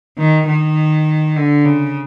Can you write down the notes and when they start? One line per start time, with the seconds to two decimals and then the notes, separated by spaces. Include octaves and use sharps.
0.18 D#3
0.47 D#3
1.36 D3
1.65 C#3